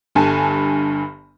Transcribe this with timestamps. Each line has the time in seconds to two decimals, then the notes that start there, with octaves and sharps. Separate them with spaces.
0.15 G1 G2 G#5 A5